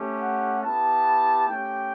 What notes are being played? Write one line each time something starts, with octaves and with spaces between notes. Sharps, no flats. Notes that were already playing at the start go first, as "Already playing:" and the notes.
Already playing: A3 C#4 G4
F#5
B3 E4 G4 A5
A3 C#4 G4 G5